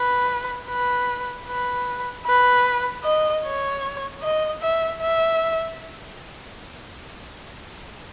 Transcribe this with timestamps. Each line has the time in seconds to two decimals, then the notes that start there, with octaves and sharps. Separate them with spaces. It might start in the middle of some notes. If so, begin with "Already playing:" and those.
Already playing: B4
0.69 B4
1.47 B4
2.26 B4
3.04 D#5
3.44 C#5
4.23 D#5
4.62 E5
5.00 E5